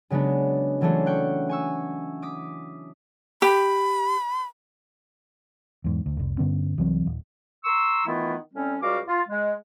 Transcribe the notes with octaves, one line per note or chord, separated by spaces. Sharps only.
C#3 F#3 G#3 B3 D4
E3 F#3 A3 C#4 D4 C5
F#5 G5 C#6
G#5 C#6 E6
D6 D#6 B6
G4 B5
E2 G#2
D2
F1 C2
G2 D3 B3 C#4
C2 E3 F#3 C4
D#1
A#5 C6 C#6 E6
D#3 E3 A3 B3 E4 F4
A2 G3 C4 C#4
C#2 G3 F#4 F5 D6
F4
G#3